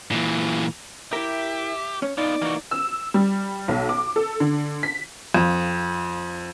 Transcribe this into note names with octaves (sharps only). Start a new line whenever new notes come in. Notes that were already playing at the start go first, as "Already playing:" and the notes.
A#2 E3
E4 G4 A#4 E5
C#4 C#5
B3 D#4 F4 D5
E3 A#3 D#4 F#4
E6
G3
B1
D6
A4
D3
B6
F2